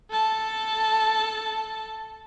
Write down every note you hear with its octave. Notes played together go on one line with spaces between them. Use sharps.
A4 A5